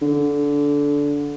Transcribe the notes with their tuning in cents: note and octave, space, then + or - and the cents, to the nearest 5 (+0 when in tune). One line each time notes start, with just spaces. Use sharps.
D3 -20